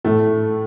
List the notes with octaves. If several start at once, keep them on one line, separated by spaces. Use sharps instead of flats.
A2 A3